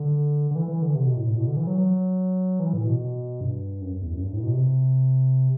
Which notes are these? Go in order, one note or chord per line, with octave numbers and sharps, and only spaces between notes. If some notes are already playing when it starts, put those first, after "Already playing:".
Already playing: D3
D3
E3
E3
D3
C3
B2
A2
A2
B2
D3
E3
F#3
F#3
E3
A2
B2
B2
G2
F#2
E2
F#2
G2
A2
B2
C3